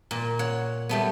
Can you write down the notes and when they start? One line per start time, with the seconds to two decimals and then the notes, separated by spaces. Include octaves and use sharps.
0.11 A#2
0.39 C#5 F#5
0.89 G3 A3 B3